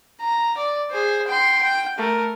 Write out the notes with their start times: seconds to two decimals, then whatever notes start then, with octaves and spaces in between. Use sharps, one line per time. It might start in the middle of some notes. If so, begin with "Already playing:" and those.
0.20 A#5
0.57 D5
0.91 G#4 C5
1.27 G5 C6
1.62 G5
1.98 A3 A#4